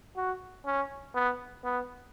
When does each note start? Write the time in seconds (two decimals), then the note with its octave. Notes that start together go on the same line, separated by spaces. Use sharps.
0.16 F#4
0.66 C#4
1.14 B3
1.64 B3